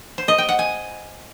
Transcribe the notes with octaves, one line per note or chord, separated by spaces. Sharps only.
C5
D#5
G5
F#5
G#5